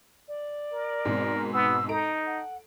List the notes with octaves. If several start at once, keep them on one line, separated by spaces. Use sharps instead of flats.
D5
A#4
G#2 B2 C4
B3 E6
D#4 A4 A#5 D7
F#5